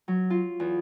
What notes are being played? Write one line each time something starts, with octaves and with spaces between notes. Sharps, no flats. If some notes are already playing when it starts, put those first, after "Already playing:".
F#3
F4
E2